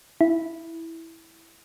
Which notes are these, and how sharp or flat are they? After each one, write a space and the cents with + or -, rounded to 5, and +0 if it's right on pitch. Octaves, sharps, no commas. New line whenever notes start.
E4 +0